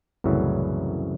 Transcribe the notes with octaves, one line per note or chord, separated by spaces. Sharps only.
C2 F#2 A2 C#3 E3 F#3